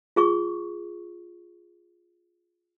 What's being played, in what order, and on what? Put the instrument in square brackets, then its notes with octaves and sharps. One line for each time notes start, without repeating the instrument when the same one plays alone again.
[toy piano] F4 G#4 C#6